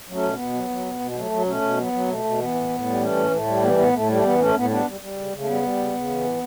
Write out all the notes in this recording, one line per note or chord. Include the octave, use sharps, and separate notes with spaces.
F#3 A3 C#4
B2
B2 B3
F#3
F#3
B2
B2
B3
F#3 A3
F#3
B2 A3 C#4
B2
F#3 B3
F#3
B2 A3
B2
E3 B3
A2
A2
G3
E3 A3 C#4
A2
A2 A3
G3
E3 B3
A3
A2 B3
A2 A3
G3 A3
E3 B3
A2 A3 C#4
A2 B3
G3 B3 D4
G3
G3
C#3
C#3
A3
G3 B3
G3
C#3
C#3
E3
A2